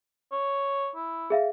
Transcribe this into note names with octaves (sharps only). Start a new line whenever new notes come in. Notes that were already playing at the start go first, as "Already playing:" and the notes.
C#5
E4
G#4 E5 F5